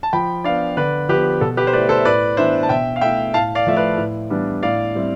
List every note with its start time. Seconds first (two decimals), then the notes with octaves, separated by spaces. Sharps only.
0.03 A5
0.13 F3 G5 B5
0.44 B3 D4 D5 F5
0.77 D3 B4 D5
1.09 F3 B3 G4 B4
1.41 B2 A4
1.57 G4 B4
1.67 C5
1.73 A3 E4 B4 D5
1.89 A4 C5
1.98 E5
2.05 A2 B4 D5
2.37 E3 B3 D4 C5 E5
2.63 A5
2.69 B2 E5 G5
2.96 F5
3.01 A3 E4 E5 G5
3.34 A2 F5 A5
3.55 D5 F5
3.67 F3 A3 E5
3.76 B4 D5
3.98 A2
4.30 E3 G3 B3 D4
4.63 A2 D5 F5
4.95 G3 C4 E4